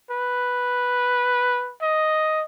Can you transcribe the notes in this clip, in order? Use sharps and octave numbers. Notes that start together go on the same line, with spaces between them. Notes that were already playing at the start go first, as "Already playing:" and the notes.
B4
D#5